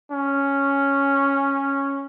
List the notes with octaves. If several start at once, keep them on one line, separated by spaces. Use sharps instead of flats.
C#4